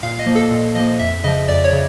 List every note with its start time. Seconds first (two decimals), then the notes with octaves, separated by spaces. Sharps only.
0.03 A#2 F5
0.19 D#5
0.26 F3 A#3
0.35 A4
0.51 A#2 A4
0.75 F3 A#3 D#5
0.99 F2 E5
1.24 C#3 F3 D#5
1.48 F2 D5
1.64 C#5
1.73 C#3